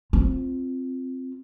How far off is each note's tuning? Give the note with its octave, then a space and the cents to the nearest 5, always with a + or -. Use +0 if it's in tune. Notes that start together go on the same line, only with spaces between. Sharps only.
C4 +0 F4 +0